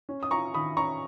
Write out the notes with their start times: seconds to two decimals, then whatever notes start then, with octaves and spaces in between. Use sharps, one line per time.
0.09 C#4
0.23 D#6
0.31 F4 A#5 C#6
0.54 D#3 B5 D#6
0.77 C#4 A#5 C#6